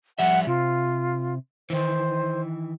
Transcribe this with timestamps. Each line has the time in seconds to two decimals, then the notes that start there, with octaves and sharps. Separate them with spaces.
0.19 F3 G3 E5 F#5
0.47 C3 F4
1.70 D#3 E3 C5